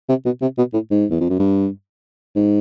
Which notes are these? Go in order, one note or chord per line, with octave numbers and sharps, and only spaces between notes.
C3
B2
C3
B2
A2
G#2
E2
F2
F#2
G2
G#2